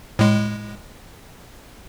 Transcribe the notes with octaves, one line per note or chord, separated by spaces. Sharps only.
A2 G#3